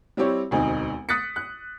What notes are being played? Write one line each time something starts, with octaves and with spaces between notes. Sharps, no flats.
G3 C4 E4 G4 C#5
E1 D2 C4 D#4
D#6 F#6 A6 B6 C#7
F#6